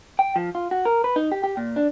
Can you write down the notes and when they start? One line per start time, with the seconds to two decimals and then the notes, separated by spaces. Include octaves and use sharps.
0.19 G5
0.36 F3
0.55 F4
0.71 F#4
0.85 A#4
1.04 B4
1.16 D#4
1.32 G4
1.44 G4
1.57 A#2
1.76 D4